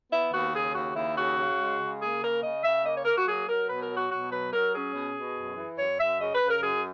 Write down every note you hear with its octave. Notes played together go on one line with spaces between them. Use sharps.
B3 E4
D#2 F#4
C#3 G#4
D#2 F#4
D#2 E4
C#3 F#4
C#3
G#3
C#3
A#3 G#4
C#3 A#4
C#3 D#5
C#3 E5
A#3 D#5
C#5
A#3 A#4
F#4
F#3 G#4
F#3 A#4
B2 B4
A#4
F#3
F#4
B2 F#4
F#3 B4
F#3 A#4
C#4 G#4
B2
B2
F#2
E3
F#2 C#5
F#2 E5
C#3 D#5
B4
C#3
A#4
F#2 G#4